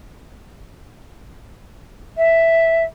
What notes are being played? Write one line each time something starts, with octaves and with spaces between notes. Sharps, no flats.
E5